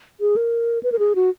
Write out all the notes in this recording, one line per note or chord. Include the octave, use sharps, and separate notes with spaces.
G#4
A#4
B4
A#4
G#4
F#4